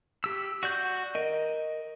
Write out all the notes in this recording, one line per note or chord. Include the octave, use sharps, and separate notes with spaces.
G4 E6
F#4 D5 G6
A#4 D#5